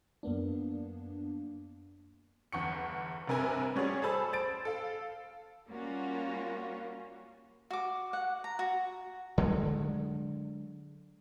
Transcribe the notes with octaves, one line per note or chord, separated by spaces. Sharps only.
F#2 A#3 B3 D4
G1 E2 C#6 C#7
F1 G2 C3 A#4 B4 G#5
G3 C#4 F#4 G#4 C#5 D5
G#4 A4 C5 A5 B5 E6
C5 A6 D7
A4 F5
G3 A#3 C#4 F4 F#4
F#4 D6
F#5
A#5
F#4
D3 F#3 G#3